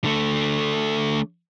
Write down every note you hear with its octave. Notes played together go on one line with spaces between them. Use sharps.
D3 A3